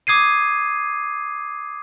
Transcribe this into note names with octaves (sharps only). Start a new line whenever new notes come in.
D6 D#6 G#6 C7 D#7